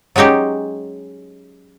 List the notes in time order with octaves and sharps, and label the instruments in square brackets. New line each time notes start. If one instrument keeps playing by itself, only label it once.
[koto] F#3 G#3 C#4 D#4 G4